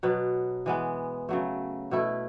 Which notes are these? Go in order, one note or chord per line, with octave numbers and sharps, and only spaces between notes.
B2 F#3 B3
E3 G#3 B3
C#3 F#3 A3
B2 A3 E4